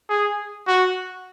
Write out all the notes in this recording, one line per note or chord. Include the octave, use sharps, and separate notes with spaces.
G#4
F#4